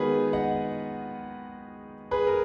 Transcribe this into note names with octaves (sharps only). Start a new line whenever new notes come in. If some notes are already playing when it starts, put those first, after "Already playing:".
Already playing: D#3 G#3 B3 D#4 F#4 G#4 A#4 B4
D#5 F#5
G#4 B4
A#4